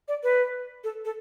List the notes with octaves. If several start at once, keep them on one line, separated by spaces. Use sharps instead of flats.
D5
B4
A4
A4